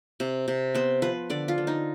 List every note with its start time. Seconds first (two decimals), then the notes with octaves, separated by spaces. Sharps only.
0.20 C3
0.48 C3
0.75 B3 C5
1.02 F3 B4
1.30 D3 D5
1.48 F4
1.58 D3
1.67 D#4